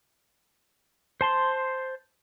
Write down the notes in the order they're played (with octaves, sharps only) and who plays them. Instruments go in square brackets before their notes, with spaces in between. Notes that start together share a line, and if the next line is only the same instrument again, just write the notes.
[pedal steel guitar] C5 A5 C6